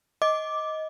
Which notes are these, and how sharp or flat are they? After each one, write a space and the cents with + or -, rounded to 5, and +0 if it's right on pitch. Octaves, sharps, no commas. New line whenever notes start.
D#5 +15 D6 +0